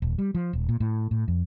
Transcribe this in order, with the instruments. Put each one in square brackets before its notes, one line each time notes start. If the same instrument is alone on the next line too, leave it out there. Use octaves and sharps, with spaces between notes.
[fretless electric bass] D#1
G3
F3
D#1
A#2
A2
A2
F2